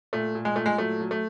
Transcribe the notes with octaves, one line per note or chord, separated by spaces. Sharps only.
A#2 A3
A#2
G#3
A#2 A3
G#3
F#3 A3
F#3
A3